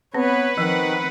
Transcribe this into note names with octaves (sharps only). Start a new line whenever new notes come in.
B3 C4 B4 C#5
D#3 F3 C4 F#5